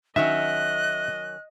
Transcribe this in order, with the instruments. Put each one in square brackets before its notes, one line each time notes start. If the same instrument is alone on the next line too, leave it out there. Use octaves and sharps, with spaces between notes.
[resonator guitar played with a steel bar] D#3 F#3 C#4 [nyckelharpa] D#5 [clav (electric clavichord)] E5 [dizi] F#6